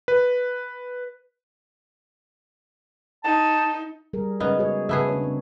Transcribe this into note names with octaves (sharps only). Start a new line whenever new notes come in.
B4
D#4 A5
G3 G#4 A#4
C#3 G#3 B3 D#4
F#4 G#4 C#5
C#3 A3 B3 G#4
D4 C#5
C4